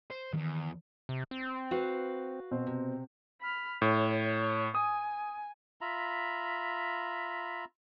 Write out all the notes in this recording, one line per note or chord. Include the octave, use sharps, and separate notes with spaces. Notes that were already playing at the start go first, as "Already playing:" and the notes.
C5
E2 G2 D#3
C3
C4
F#4 B4 F5
B2 C4
C3
B5 F6
A2 C#5
G#5 D#6
F4 E5 A#5 B5